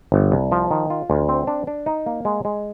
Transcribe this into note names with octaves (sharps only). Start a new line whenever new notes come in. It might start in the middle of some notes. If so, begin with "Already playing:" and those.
G1
C2
F3
D#3
F4
D2
C4
D4
D4
D#4
A#3
G#3
G#3